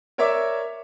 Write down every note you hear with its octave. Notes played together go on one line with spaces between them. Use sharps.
A#4 C#5 D5 E5 D6 E6